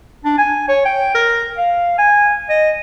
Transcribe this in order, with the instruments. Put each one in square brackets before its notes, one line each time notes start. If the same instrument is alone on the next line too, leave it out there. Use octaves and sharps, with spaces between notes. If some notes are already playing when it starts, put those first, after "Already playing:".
[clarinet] D4
G#5
C#5
G5
A#4
F5
G#5
D#5